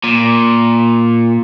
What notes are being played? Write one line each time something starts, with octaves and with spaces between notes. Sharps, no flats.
A#2